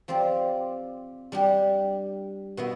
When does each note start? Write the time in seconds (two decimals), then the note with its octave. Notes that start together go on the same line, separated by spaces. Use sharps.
0.08 F3 C4 G4 D5
1.32 G3 D4 G4
2.57 B2 B3 E4